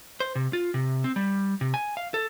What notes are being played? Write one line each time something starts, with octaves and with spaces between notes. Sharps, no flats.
C5
C3
F4
C3
C4
G3
C3
G#5
F5
A4